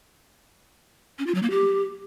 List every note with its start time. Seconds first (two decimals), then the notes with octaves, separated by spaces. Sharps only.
1.19 C#4
1.27 F4
1.35 F#3
1.43 A#3
1.50 G4